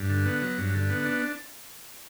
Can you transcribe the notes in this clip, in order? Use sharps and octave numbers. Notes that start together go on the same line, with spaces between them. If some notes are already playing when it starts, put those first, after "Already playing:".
Already playing: G2
D3
B3
F#3
G2
D3
B3
D4